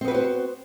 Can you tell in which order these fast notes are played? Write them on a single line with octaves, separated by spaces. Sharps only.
C4 B3 B4 F#4 C5